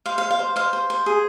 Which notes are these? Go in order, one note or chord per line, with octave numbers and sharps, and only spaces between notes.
C5 F5
F5
C5
F5
C5
C5 F5
C5
C5
G#4